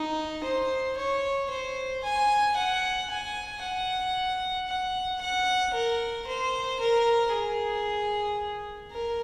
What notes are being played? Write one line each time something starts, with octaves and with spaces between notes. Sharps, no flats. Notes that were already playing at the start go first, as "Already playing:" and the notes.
Already playing: D#4
C5
C#5
C5
G#5
F#5
G#5
F#5
F#5
F#5
A#4
C5
A#4
G#4
A#4